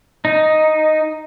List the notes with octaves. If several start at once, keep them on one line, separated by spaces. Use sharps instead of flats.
D#4